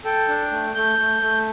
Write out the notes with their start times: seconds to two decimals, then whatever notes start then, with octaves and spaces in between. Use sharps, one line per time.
0.05 A4 G5
0.28 D4
0.51 A3
0.75 A3 G6
0.99 A3
1.22 A3